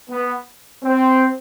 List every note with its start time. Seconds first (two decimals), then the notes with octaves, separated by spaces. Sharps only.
0.09 B3
0.83 C4